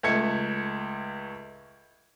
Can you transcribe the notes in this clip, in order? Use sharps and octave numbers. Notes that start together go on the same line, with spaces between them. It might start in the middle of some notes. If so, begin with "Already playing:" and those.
C#2 A3 G#6 C#7